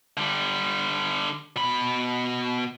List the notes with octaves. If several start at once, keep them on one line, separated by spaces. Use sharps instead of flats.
D3 G3
B2 B5